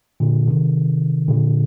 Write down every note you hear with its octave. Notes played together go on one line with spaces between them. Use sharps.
A#2 D3
C3 D#3
A#2 D3